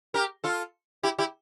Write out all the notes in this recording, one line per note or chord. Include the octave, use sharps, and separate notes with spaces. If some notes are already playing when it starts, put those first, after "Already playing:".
G4 A#4
F4 A4
E4 G4
E4 G4